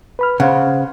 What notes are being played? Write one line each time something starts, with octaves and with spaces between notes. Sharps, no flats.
B4 B5 F6
C#3 C5 F5 F#5